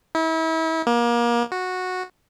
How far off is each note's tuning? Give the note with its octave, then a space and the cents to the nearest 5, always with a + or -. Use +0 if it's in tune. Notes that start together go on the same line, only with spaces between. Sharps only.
E4 -35
A#3 +30
F#4 -10